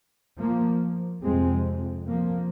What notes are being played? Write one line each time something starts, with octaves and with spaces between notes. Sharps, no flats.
F3 A#3
F2 C3 G#3 C4
F3 A#3